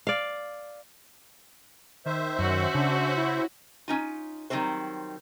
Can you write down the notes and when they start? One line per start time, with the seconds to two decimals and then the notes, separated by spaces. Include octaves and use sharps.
0.07 D5 F5
2.06 D#3 C5 E5
2.39 F#2 C#4 F#4
2.75 C#3 D4
3.17 E4
3.88 C#4 D#4 F4
4.50 D#3 F#3 G3 C4 C5